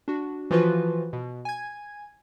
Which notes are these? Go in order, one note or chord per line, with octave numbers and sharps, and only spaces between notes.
D4 F#4
E3 F3 F4 F#4 B4
B2
G#5 G#6